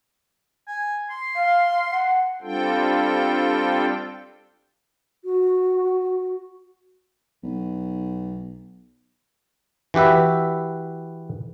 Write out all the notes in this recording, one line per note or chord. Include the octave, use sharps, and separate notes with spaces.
G#5
C6
F5
F#5
G3 C4 D4 F4 A4 G5
F#4
B1
E3 F#4 G4 B4 E5